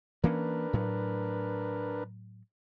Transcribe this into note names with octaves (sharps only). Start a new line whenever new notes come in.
E3 A#3 C#4 D4 A#4 B4
A2 F#3